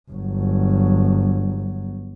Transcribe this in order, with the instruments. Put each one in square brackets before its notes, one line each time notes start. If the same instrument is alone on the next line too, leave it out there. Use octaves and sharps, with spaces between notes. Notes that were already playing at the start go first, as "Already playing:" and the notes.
[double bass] G1 F#3